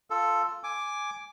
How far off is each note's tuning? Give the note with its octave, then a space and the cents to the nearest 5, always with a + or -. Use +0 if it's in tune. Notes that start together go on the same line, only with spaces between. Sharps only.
F4 -5 A4 +5
G#5 +0 D6 +0